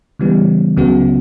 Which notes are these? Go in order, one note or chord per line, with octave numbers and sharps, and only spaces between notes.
C#3 E3 G3 B3
C#2 C#3 F#3 B3 F#4